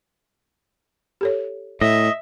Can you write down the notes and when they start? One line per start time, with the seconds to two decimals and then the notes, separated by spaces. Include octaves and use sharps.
1.21 G4 A4 C#5
1.81 A2 D#5 E5